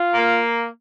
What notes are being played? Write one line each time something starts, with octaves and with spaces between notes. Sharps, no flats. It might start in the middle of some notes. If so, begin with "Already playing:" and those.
Already playing: F4
A#3